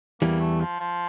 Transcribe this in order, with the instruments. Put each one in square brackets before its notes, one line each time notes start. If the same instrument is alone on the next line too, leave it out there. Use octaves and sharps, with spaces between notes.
[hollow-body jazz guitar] E2 E3 G3 [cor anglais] A#3
[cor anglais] A3
F3
F3